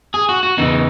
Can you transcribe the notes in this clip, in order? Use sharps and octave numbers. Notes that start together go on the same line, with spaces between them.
G#4
F#4
F#4
E2 C#3 E3 D#4